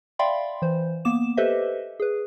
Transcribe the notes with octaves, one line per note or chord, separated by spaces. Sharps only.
D5 E5 F5 G5 B5 C6
E3 C5
A#3 B3 D6 E7
G4 A4 B4 C5 D#5 E5
G#4 B4